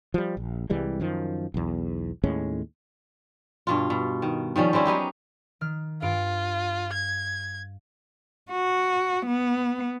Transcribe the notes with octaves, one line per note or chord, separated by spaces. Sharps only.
F3 G3
A#1
C2 E3 G3 G#3
F#2 D#3 F3
B1 E2
D#2 A2 G#3 C#4
G2 B2 F4
B2
D#3
D#3 F3 G3 C#4
G3 C4 C#4 E4
F#3 B3 D#4 G4
D#3 F6
G2 F4 F5 D7
G#6
F#4
B3